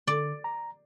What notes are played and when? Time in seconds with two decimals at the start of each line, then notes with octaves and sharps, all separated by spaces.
0.07 D3 D5
0.44 A#5